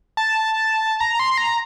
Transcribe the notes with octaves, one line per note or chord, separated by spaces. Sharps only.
A5
A#5
C6
A#5